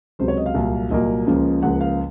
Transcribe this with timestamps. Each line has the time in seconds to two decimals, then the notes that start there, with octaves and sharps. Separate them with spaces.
0.19 C#2 C3 F#3 C5
0.28 C#5
0.38 D#5
0.46 F5
0.54 C2 A#2 F#3 A#3
0.90 C2 A#2 F#3 A#3 D#5
1.26 C#2 C#3 F3 A#3
1.63 C#2 C#3 F3 A#3 F#5
1.81 F5